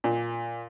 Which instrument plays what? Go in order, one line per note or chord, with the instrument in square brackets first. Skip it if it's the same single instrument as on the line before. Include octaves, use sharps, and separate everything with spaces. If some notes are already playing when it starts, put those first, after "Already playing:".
[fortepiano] A#2